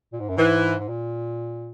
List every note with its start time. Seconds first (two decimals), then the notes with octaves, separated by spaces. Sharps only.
0.13 A#2
0.20 G#2
0.29 F#2
0.37 G#2 E3
0.79 G#2
0.89 A#2